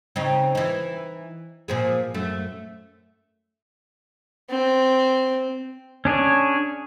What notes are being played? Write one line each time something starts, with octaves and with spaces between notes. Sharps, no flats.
C#3 C4 D#4
E3 D#4
A#2 F3 G#4
F#2 A3
C4
C#4 D4 G#4 C#5